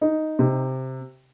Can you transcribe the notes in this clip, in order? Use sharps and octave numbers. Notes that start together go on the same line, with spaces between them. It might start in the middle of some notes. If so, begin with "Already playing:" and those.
D#4
C3